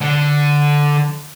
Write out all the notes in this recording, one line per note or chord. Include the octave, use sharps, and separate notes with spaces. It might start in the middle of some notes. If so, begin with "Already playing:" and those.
D3